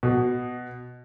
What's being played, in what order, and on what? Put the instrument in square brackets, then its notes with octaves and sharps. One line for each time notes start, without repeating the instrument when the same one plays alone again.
[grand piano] B2